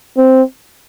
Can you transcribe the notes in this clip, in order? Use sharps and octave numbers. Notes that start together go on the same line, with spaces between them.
C4